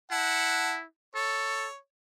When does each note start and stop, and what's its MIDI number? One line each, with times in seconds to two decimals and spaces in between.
0.11 0.85 64
0.11 0.75 78
0.11 0.75 81
1.15 1.67 69
1.15 1.76 73